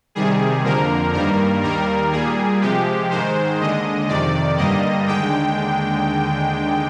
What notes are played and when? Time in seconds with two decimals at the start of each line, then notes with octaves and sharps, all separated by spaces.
0.15 C3 D#3 G3 G#4
0.64 F2 D3 F3 A#3 A#4
1.13 G2 D#3 G3 A#3 A#4
1.63 D#2 D#3 G3 A#3 A#4
2.12 A#2 G3 A#3 G#4
2.61 C3 F3 G#3 G4
3.10 G#2 D#3 G#3 C5
3.60 D#2 D3 G#3 D#5
4.08 F2 C3 D#3 D5
4.58 G2 D3 G3 A#3 D#5
5.07 D#2 D3 G#3 G5